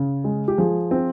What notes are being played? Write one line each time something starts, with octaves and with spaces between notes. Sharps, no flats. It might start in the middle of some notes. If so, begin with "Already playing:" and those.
Already playing: C#3
G#3
G4
F3 G#4
C4